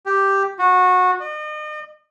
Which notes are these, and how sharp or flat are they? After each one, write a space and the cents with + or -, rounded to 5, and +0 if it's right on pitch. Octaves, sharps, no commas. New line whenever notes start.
G4 +0
F#4 -20
D#5 -40